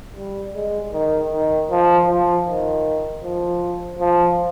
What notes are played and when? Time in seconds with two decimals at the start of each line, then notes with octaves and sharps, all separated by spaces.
0.16 G3
0.55 G#3
0.93 D#3
1.32 D#3
1.70 F3
2.08 F3
2.46 D#3
3.23 F3
3.99 F3